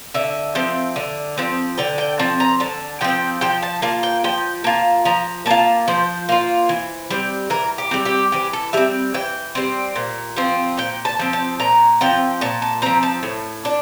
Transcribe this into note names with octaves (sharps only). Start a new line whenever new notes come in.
D3 E5
F3 C4
D3
F3 C4
D3 G5
G5
F3 C4 A5
A#5
D3 A5
F3 C4 G5
F3 G5
A5
A#3 F4 A5
G5
F3 G5
A#3 F4 A5
F3 A#5
A#3 F4 A5
F3 C5
A#3 F4
E3
G3 C4
E3 A#4
G4
G3 C4
G4
E3 G4
A4
G3 C4 E5
E3 G5
G3 C4
A#2
F3 C4
A#2 G5
A5
F3 C4
A5
A#2 A#5
F3 C4 G5
A#2 A5
A5
F3 C4 A#5
A5
A2
D4